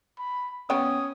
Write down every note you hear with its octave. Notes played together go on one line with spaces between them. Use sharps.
B5
C#3 B3 C#4 G5 D#6